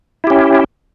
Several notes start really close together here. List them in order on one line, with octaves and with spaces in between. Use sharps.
E4 G4 C#4